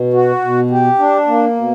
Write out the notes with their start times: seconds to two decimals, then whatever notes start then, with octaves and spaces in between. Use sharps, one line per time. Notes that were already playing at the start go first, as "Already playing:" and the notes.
Already playing: B2
0.13 F#4
0.42 B2
0.71 G4
0.99 D4
1.27 A#3
1.56 B2